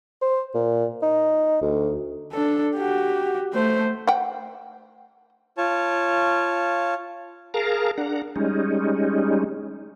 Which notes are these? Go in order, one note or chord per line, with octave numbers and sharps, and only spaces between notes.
C5
A#2
D#4
D2
D4 A4
F#4 G4
A3 C5
F#5 G5
F4 C#5 A5
G#4 A#4 F5 A5 A#5
D4 F#5 A#5
G3 G#3 C#4 D#4